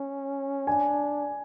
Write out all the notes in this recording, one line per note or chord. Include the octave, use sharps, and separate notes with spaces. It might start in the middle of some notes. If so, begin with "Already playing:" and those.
Already playing: C#4
D4 G#5